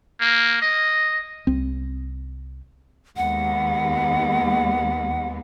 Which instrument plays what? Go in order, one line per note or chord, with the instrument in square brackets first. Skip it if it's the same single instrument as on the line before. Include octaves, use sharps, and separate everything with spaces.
[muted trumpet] A#3
D#5
[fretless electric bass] C2 C4
[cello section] D#2 G#3 B3 [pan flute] F#5